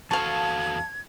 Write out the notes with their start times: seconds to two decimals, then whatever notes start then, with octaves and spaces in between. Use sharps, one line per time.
0.11 E2 F#4 A4 F5 A5 C#6 G#6